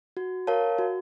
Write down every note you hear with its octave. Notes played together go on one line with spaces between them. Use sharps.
F#4
A#4 C#5 F5 A5
F#4